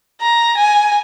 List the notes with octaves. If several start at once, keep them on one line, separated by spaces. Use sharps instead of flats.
A#5
G#5